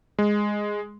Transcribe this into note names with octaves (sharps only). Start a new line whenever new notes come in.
G#3